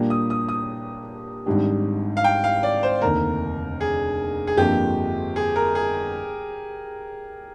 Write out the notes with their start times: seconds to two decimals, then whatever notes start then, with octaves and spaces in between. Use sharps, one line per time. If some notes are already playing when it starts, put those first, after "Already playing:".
Already playing: A#2 G3 A#3 D4 G4
0.10 D#6
0.30 D#6
0.49 D#6
1.46 G#1 G#2 G3 D4 G4
2.17 F5
2.24 G5
2.44 F5
2.63 D5
2.83 C5
3.02 F1 D#2 D3 A#4
3.81 G#4
4.47 G#4
4.57 G1 F2 D3 F3 A#3 G4
5.36 G#4
5.56 A#4
5.75 G#4